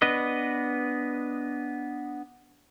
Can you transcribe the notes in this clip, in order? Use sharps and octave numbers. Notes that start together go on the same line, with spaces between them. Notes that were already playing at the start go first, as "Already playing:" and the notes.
B3 D4 B4 D#5